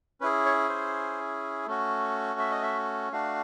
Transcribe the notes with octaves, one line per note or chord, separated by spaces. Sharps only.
C#4 E4 G#4 B4
C#5
C5
A3 C#4 F#4
E5
D#5
E5
A3 D4 F#4 F5